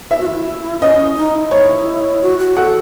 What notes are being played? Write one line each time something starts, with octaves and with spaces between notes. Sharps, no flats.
E4 E5
F#4
E4
C#4 D#5
D#4
E4
C#5
F#4
F#4
A4 F#5